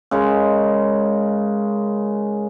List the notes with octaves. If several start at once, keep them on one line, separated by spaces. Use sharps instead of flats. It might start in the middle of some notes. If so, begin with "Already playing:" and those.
C#3 G#3 A#4